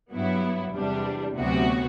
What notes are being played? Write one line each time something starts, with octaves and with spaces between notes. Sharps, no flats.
G2 F#3 B3 E4
E2 C3 G3 D4
D2 C3 F#3 B3 F#4